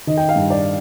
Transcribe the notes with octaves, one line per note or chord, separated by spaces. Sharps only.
D#3 D#5
G5
F5
G2
D5